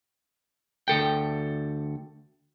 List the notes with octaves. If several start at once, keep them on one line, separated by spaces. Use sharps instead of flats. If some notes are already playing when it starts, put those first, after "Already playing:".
D2 A4 G5